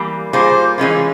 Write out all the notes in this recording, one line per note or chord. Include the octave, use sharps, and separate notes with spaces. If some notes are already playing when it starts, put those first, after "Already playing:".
Already playing: E3 G3 A#3
G3 A#3 F4 G#4 C5
E3 G#3 C#4 F4